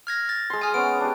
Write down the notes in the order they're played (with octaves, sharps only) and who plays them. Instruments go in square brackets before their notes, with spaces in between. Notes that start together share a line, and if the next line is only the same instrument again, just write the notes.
[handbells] F6 G#6 A#6
A6
[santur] G#3 C6
[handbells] G#5 D#6 F6
[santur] B3 C#4 [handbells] D7
[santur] D4 G4